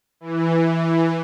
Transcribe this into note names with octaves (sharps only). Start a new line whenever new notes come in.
E3